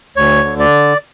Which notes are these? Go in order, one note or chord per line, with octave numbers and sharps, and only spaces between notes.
D2 C#5
D3
D5